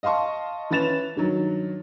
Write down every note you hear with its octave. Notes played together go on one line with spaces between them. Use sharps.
D#5 F5 A5 C6 C#6
E3 C#4 B4 A6 E7 F7
G2 D#3 F#3